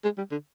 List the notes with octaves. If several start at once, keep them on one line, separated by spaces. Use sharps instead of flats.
G#3
G3
D3